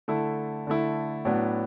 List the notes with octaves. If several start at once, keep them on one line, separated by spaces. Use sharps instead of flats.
D3 A3 E4
D3 A3 E4
A2 F#3 B3 D4